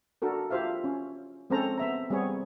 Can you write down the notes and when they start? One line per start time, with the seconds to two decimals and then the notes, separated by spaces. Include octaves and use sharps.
0.22 D4 F#4 A4 A#4
0.51 F4 G4 C5 E5 F5
0.84 C#4
1.50 G#3 C4 C#4 A4 C5 A#5
1.77 B3 E5 A#5
2.10 G3 B3 C4 G#4 C#5